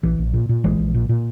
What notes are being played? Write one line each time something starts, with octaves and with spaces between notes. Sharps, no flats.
A#1 E3
A#1
A#2
A#2
A#1 E3 G#3
A#1
A#2
A#2